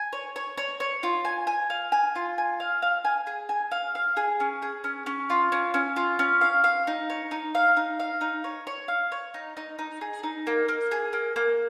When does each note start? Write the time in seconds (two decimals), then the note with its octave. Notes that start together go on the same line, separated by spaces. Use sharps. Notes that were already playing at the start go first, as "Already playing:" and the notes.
Already playing: G#5
0.13 C#5
0.36 C#5
0.58 C#5
0.80 C#5
1.03 F4
1.25 G#5
1.47 G#5
1.70 F5
1.92 G#5
2.15 F4
2.38 G#5
2.60 F5
2.82 F5
3.05 G#5
3.27 G#4
3.49 G#5
3.72 F5
3.95 F5
4.17 G#4
4.40 C#4
4.62 G#4
4.84 C#4
5.06 C#4
5.30 F4
5.52 C#4
5.74 C#4
5.96 F4
6.19 C#4
6.41 F5
6.64 F5
6.87 D#4
7.10 C#5
7.31 D#4
7.55 F5
7.77 D#4
8.00 F5
8.21 D#4
8.44 C#5
8.67 C#5
8.88 F5
9.12 C#5
9.34 D#4
9.57 D#4
9.79 D#4
10.01 G#4
10.23 D#4
10.47 A#3
10.68 A#3
10.91 G#4
11.13 A#3
11.36 A#3